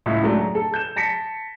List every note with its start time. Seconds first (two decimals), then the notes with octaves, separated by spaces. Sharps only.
0.06 C#2 A2 E5
0.23 F#3 G#3 A3 D4
0.40 A#5
0.55 A4
0.74 G6 E7
0.96 A5 A#6 B6 C#7